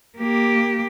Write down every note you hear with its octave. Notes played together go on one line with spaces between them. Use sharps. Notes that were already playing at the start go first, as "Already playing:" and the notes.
A#3 G4